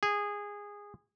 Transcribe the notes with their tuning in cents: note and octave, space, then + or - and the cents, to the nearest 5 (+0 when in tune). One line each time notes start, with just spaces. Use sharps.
G#4 -15